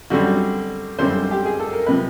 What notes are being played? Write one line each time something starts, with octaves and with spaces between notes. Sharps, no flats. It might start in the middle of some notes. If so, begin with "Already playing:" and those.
F#2 D3 G3 C4 F#4
F#2 D3 G3 C4 C5
G4
G#4
A4
A#4
C3 F3 B4